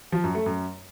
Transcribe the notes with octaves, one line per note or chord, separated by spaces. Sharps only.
F3
F#2
A3
F#2